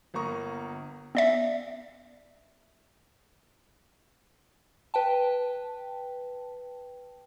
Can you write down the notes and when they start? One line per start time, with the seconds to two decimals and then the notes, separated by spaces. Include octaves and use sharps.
0.14 G1 A#3 A#5 C#6 D#6
1.15 B3 D5 E5
4.94 B4 G5 A5